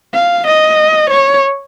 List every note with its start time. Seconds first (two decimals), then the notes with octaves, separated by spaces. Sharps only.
0.14 F5
0.47 D#5
1.10 C#5